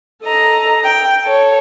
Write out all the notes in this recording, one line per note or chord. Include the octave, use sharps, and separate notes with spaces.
A4 D#5 A#5
G5
A4 C#5